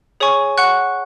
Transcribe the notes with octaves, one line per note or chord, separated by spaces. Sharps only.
G#4 C#5 G#5 C#6
F#5 C#6 F#6